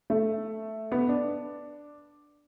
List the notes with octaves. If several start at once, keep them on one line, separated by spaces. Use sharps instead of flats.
A3
B3
D4